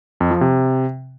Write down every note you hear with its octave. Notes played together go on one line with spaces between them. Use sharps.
F2
F3
C3